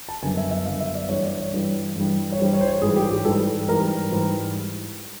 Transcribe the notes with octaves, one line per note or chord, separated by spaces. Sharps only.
A5
F#2 D3 G3 B3 G#5
E5
E5
F#2 D3 G3 B3 F5
E5
D5
G2 E3 G3 C#5
D5
C#5
G2 E3 G3
G2 E3 G3
C#5
G2 E3 G3 C5
C#5
C5
C#5
G#2 E3 G3 G#4
G4
G4
G#2 E3 G3 A4
G#2 E3 G3 A#4
G#2 E3 G3